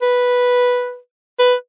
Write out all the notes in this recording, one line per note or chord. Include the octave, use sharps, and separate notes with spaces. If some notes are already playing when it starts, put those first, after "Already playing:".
B4
B4